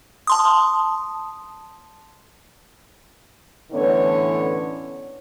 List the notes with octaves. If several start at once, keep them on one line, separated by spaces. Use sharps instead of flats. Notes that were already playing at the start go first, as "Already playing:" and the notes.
A5 C6 D#6
A2 D3 E3 B3 C#4 C#5